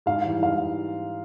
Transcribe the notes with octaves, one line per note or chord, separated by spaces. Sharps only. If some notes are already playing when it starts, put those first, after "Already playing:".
G#2 F5
E3 G3
G#2 F5